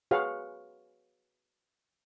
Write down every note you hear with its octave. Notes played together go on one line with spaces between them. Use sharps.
F#4 G#4 B4 C#5 F5 F#5